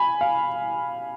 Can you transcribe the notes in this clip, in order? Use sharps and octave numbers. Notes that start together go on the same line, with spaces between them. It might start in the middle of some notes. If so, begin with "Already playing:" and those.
Already playing: G#5 B5
F5